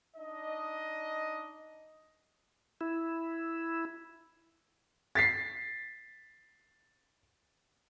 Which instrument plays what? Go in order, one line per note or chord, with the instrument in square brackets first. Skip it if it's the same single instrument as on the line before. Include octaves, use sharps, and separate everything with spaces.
[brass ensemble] D4 D#4 D#5
[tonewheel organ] E4
[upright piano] A6 B6 C7